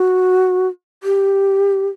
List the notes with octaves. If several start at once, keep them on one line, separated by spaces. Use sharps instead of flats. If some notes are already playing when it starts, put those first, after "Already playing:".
Already playing: F#4
G4